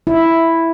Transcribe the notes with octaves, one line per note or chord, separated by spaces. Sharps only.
E4